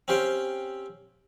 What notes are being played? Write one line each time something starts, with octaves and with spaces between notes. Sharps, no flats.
C4 C#4 G4 C5 F5 G5